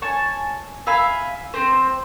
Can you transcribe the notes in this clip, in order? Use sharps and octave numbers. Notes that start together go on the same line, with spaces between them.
C#5 G#5 A5
E5 F5 G#5 B5
C4 C5